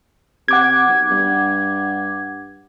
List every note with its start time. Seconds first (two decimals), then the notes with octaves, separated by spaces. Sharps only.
0.48 C3 F#5 D6 G#6
0.88 B1
1.11 G2